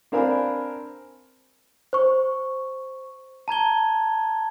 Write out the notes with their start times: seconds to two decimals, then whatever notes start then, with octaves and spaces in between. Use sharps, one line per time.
0.12 C4 D4 A#4 F5 G#5 B5
1.93 C5 C#6
3.48 A5 A#5 G#6 G7